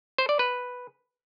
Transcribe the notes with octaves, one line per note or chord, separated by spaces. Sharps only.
C5
D5
B4